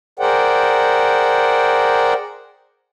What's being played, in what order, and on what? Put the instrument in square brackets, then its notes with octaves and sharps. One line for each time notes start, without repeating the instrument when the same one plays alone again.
[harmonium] G#4 A#4 C5 D5 F#5 G5